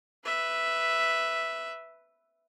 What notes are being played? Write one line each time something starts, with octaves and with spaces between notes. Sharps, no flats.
B4 E5